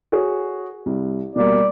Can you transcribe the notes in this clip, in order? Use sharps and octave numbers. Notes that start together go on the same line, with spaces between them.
F#4 G#4 C#5
C2
B2 G3 A#3 D5